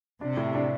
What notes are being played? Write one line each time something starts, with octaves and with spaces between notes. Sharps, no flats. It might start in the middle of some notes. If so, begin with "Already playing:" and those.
C3 D4
A2
D4